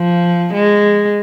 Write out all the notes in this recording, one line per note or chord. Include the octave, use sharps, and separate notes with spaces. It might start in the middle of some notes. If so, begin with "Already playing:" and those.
Already playing: F3
G#3